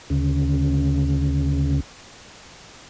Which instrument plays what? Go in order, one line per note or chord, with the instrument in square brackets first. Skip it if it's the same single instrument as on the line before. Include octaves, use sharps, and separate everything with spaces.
[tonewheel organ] D2 C#3